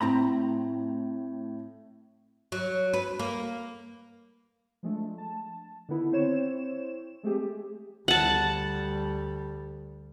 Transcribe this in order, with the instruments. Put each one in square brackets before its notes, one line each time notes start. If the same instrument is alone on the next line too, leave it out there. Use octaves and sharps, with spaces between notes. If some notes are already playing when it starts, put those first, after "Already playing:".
[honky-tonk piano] A2 [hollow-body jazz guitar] C4 A#5 B5
[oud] F#3
B4
A#3
[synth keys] F3 G#3 A3 D4
A5
D3 D#3 B3 E4
C4 E4 C5 C#5 E7
G#3 A3 C4 G4 G#4
[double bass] D2 G3 [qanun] F#5 A5